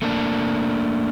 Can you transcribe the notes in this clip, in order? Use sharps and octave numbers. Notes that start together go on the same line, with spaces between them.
A3 A#3 D4